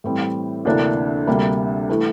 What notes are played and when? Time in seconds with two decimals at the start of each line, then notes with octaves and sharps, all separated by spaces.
0.04 A2 E3 G3 C4
0.65 D2 C3 E3 A#3 D4
1.27 D2 C3 G3 A#3
1.90 E3 A3